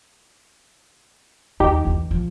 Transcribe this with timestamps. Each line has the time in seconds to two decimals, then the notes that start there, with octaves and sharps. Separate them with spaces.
1.60 D#2 D#4 G4
1.85 E2 C#3
2.11 F3